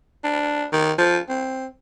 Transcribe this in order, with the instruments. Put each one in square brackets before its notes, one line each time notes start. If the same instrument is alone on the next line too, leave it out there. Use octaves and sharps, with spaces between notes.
[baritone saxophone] D4
D#3
F3
C4